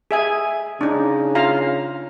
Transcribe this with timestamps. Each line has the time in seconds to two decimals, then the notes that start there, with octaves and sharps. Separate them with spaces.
0.11 G#4 E5 G#5
0.81 C#3 D4 D#4
1.35 F4 F5 A#5